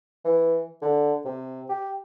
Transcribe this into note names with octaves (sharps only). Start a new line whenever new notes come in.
E3
D3
C3
G4